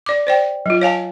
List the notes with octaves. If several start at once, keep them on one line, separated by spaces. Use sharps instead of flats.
D5 D6
C5 D5 G5
F#3 F4
C#5 F5 G#5 A5